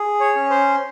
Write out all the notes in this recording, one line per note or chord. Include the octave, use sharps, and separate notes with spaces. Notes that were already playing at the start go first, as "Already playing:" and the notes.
Already playing: G#4
C#5
C#4
C5